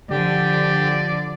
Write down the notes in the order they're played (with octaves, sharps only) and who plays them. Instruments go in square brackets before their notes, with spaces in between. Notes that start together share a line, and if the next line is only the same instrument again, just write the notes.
[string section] D3 F3 [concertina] G4 [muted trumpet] D5